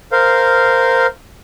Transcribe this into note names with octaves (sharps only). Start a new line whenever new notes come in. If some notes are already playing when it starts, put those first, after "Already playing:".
A#4 C5 F5